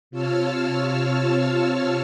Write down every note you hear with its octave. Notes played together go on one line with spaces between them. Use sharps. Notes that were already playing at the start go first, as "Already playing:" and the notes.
C3 F4 C#5 A5 E6 F6